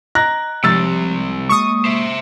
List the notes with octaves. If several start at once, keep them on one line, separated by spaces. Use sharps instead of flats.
D#5 A#5 F#6 A#6
C2 C3 F3 G#3 G4 E6 A6
G#3 A#3 C#6 D#6
C5 E5